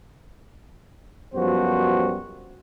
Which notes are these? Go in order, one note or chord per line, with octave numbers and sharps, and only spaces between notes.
F#2 F3 G3 B3 F#4 C5